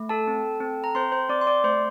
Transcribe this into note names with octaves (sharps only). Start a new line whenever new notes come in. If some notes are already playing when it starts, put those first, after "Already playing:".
Already playing: A3
A4 A5
C4
C4
A#5
C4 C5 C6
C5 C6
C4 D5 D6
C6
D5 D6
A3 C5 C6